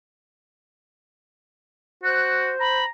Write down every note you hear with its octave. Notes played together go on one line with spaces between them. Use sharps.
F#4 C5 F#6
A#5 B5